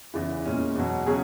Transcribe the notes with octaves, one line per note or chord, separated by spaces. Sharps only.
E2 C#3 E3
A#2 G#3 C#4
E2 B2 F#3
C#3 F#3 C#4 G#4